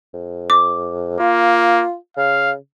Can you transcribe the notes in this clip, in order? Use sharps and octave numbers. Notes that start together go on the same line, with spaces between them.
F2
D6
A#3 F4
C#3 F5